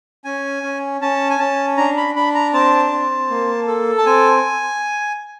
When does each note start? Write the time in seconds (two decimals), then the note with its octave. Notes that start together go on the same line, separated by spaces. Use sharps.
0.25 C#4 G#5
0.63 C#4
1.01 C#4 A5
1.30 G#5
1.39 C#4 A5
1.77 D4 A#5
1.97 B5
2.15 D4 B5
2.35 A#5
2.53 C4 A5
2.91 C4
3.30 A#3
3.67 A4
3.98 A5
4.06 C4 G#5